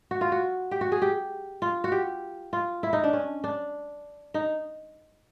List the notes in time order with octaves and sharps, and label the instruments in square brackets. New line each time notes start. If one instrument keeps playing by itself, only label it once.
[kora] F#4
F4
F#4
G4
F#4
G#4
G4
F4
F#4
G4
F4
E4
D#4
D4
C#4
D4
D#4